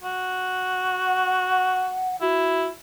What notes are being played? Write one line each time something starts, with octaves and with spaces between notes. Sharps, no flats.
F#4
F#5
F#5
E4 F#4